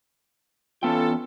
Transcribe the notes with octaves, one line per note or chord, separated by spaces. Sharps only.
E2 B3 C#4 F4 A4 G5